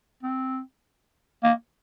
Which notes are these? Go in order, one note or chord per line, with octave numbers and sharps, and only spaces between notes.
C4
A#3